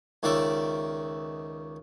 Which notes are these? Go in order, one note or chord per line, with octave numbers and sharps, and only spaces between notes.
C#2 D#3 C#4 D5 E5